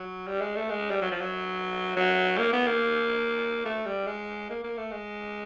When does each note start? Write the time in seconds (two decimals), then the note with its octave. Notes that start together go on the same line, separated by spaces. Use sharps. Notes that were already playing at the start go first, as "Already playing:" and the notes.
Already playing: F#3
0.27 G3
0.41 G#3
0.56 A3
0.70 G#3
0.90 G3
1.01 F#3
1.11 F3
1.21 F#3
1.96 F#3
2.38 A#3
2.53 B3
2.67 A#3
3.65 A3
3.86 G3
4.07 G#3
4.50 A#3
4.64 A#3
4.77 A3
4.92 G#3